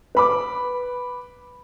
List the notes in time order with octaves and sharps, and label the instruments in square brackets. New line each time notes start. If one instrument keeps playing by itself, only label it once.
[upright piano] B4 B5 D6